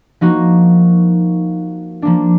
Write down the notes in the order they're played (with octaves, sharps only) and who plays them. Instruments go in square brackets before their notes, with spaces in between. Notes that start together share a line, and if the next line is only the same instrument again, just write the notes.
[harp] F3 A#3 D#4 F#4
F3 A#3 D4